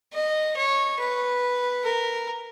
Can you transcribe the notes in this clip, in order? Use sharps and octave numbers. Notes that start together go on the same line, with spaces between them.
D#5
C#5
B4
A#4